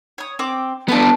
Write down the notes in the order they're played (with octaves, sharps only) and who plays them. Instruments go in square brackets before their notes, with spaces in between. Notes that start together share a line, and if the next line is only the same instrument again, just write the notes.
[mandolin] C#5 D#6
C4 G5 D6
[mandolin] A3 D5 A5 [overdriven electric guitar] B3 D4